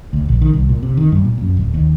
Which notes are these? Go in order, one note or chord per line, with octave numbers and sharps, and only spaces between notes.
D2
A#1
D#3
C2
A#2
C3
D#3
G2
A#2
F#2
D1
D#2